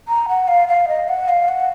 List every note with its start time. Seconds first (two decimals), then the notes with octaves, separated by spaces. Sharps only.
0.08 A#5
0.28 F#5
0.48 F5
0.68 F5
0.88 D#5
1.08 F#5
1.28 F5
1.48 F#5